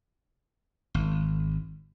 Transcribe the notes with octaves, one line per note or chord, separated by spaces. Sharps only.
G#1